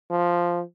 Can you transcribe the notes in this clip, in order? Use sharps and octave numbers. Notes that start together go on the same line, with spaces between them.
F3